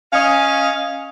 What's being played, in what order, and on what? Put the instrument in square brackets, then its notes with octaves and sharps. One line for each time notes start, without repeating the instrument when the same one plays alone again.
[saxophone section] C#4 D#5 F5